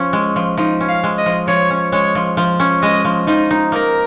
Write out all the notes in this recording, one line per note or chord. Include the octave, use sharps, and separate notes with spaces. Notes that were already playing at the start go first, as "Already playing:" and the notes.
Already playing: F3 C#4
G#3
F3
F3 D#4
C#4
F5
G#3
D#5
F3
F3 C#5
C#4
G#3 C#5
F3
F3
C#4
G#3 D#5
F3
F3 D#4
D#4
A#3 A#4